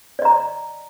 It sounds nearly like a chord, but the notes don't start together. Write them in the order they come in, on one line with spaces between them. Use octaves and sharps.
D5 D#5 A#5